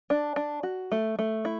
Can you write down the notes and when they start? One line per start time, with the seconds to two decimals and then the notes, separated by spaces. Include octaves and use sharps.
0.10 D4
0.36 D4
0.63 F#4
0.92 A3
1.19 A3
1.45 E4